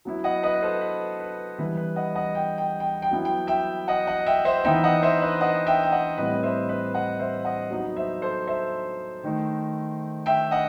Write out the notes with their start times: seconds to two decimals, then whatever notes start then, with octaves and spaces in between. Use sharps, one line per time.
0.05 F#3 B3 E4
0.24 D#5 F#5
0.43 B4 D#5
0.54 B4
0.62 A4 C5
0.81 B4
1.20 B4
1.58 E3 G3 B3 E4 B4
1.77 B4
1.96 D#5 F#5
2.15 D#5 F#5
2.35 G5
2.58 G5
2.80 G5
3.02 G5
3.11 F#3 B3 E4
3.25 G5
3.47 E5 G5
3.88 D#5 F#5
4.07 D#5 F#5
4.26 E5 G5
4.45 C5 E5
4.65 E3 B3 D#4 E5 G5
4.84 D#5 F#5
5.03 C5 E5
5.22 B4 D#5
5.41 D#5 F#5
5.66 E5 G5
5.83 G5
5.92 D#5 F#5
6.17 A2 G3 C4 B4 D#5
6.43 C5 E5
6.68 B4 D#5
6.94 D#5 F#5
7.19 C5 E5
7.45 D#5 F#5
7.70 F#3 B3 D#4
7.96 C5 E5
8.22 A4 C5
8.47 C5 E5
9.24 D#3 A3 D#4
10.26 E5 G5
10.51 D#5 F#5